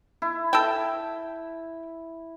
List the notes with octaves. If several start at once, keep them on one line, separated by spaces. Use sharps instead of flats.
E4
A4 G5